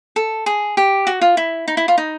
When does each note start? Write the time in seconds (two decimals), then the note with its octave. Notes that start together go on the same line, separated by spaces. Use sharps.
0.16 A4
0.46 G#4
0.77 G4
1.07 F#4
1.21 F4
1.37 E4
1.68 D#4
1.77 E4
1.88 F4
1.98 D#4